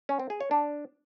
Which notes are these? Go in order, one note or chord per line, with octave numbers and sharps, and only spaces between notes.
C#4
C4
G#4
C#5
D4